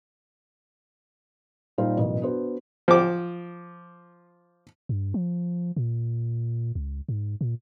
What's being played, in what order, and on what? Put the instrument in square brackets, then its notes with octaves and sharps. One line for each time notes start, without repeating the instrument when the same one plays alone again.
[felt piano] A#2 G3 D#4 C5 F5
A1 F#2 B2
B3 D4 F#4 C5
[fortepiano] F3 D6
[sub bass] G2
F3
A#2
C#2
G#2
A#2